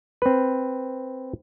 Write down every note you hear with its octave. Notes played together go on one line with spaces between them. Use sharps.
C4 B4